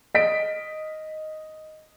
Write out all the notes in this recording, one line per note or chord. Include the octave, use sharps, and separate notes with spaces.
D#5 B6 D7